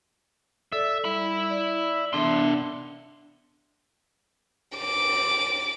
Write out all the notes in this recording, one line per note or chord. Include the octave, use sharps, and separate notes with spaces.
A4 D5 E5
G3 E5 B5
D5
B3 D4 E5 C6
D6